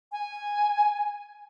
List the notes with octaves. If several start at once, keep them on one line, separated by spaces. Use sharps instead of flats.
G#5